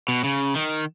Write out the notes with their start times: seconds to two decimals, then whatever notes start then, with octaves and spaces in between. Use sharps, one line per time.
0.08 B2
0.24 C#3
0.56 D#3